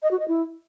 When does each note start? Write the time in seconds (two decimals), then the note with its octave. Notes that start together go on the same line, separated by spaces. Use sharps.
0.03 D#5
0.11 F#4
0.19 D#5
0.28 E4